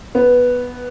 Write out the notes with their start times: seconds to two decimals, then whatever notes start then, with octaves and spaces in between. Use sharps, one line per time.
0.15 B3